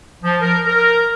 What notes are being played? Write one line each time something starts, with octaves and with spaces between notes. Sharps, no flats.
F3
A#4
A#4